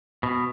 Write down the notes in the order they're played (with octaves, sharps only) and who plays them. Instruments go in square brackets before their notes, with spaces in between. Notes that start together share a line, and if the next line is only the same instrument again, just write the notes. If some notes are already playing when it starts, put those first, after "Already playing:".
[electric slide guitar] B2